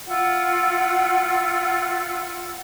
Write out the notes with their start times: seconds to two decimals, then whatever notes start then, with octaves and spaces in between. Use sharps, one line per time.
0.06 E4 F4 F#5